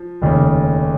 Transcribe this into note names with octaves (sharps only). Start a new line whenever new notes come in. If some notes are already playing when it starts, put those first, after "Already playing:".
Already playing: F3
F1 D#2 C#3